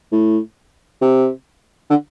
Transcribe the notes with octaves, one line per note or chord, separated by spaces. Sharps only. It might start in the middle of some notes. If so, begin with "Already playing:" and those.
A2
C3
D3